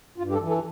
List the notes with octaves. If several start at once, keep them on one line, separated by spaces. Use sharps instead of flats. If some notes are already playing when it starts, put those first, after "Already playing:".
G2 F4
G4
A4
E3
A4